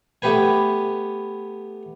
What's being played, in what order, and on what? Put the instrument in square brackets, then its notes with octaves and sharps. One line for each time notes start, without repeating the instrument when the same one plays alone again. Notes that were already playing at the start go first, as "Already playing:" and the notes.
[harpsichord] A3 B3 G4 B4 G#5